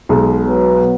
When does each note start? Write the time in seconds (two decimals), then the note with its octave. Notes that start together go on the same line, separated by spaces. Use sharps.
0.09 B1 B2 G#3
0.45 F#3 B3